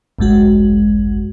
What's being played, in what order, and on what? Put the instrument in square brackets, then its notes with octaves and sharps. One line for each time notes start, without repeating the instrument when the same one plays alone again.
[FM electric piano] G#1 C#2 F#2 G#3 F#4